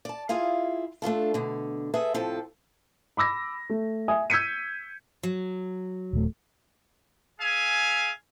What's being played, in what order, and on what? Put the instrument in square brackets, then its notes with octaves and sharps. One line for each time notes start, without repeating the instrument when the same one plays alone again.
[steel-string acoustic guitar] D5 A5
E4 F4 G#4 F5
A3 D4 F4 A4
B2 D3
G#4 A4 B4 E5
A2 C3 F3 A4
[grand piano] B5 D6 E6 A#6
A3
E5 G#5 D#6
E6 G6 G#6 B6 C#7 D#7
[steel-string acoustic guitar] F#3
[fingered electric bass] D#1 A3
[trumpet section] G#4 E5 F5 G#5